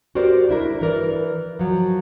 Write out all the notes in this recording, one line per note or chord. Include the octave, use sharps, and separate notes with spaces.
F#4 G4 A#4 C5 D5
D4 E4 A#4
E3 A#4 D5
F3 F#3